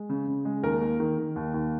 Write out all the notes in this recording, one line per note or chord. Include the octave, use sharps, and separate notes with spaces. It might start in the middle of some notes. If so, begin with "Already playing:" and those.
Already playing: G#3
C#3
C#3
G#3
D#2 A#4
A#3
D#3
D#3
D#2
D#2